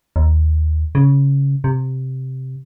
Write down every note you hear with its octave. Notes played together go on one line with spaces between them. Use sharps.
D#2
C#3
C3